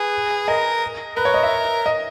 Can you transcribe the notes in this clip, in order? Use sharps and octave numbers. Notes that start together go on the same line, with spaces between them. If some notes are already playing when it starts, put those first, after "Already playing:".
Already playing: G#4 B4
A#4 D#5
A#4 B4
C#5
D#5
E5
D#5